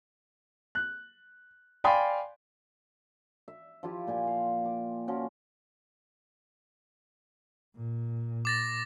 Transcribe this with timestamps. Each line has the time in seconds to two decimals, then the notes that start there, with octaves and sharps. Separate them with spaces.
0.75 F#6
1.84 D5 F5 G5 G#5 B5 C6
3.48 E5
3.83 F3 E4 F4 G4
4.07 A#2 G5 G#5
4.27 F5
4.65 D6
5.08 F3 C#4 F#4
7.76 A#2
8.45 D6 A6 A#6